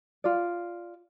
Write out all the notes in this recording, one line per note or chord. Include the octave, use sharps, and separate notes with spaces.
F4 D5